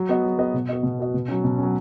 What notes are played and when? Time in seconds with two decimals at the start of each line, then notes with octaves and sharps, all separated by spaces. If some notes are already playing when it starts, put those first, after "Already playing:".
Already playing: F#3
0.09 B3 F#4 D#5
0.24 F#3
0.39 B3 F#4 D#5
0.54 B2
0.69 B3 F#4 D#5
0.83 B2
0.99 B3 F#4 D#5
1.14 B2
1.28 F#3 C#4
1.44 B2
1.58 F#3 C#4